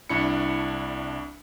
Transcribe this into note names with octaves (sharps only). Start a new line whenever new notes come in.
C2 D4 E4 B5 C#7